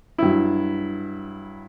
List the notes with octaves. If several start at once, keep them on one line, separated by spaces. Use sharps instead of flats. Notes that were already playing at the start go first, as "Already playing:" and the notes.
G2 F#3 E4